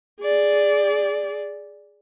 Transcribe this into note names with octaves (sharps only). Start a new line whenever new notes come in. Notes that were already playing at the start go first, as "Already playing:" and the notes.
G#4 D5